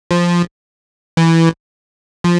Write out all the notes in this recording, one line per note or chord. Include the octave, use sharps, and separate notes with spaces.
F3
E3
F3